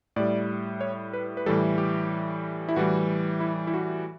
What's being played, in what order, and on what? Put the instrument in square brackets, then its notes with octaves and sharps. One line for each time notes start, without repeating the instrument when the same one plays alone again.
[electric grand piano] A2 G3 D5
C#5
B4
B4
A2 E3 G3 A4
G4
E4
A2 E3 G3 F#4
E4
E4
F#4